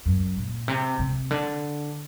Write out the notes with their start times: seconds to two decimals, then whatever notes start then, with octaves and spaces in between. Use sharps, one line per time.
0.06 F#2
0.37 A#2
0.68 C3
0.99 C3
1.31 D3